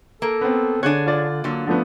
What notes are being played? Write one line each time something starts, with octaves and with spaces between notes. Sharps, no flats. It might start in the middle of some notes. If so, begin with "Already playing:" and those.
A#3 A4
B3 C4
D3 D4 G#4 C#5 F#6 G#6
F4 D5
D3 F#3 A#3
F3 A3 B3 D4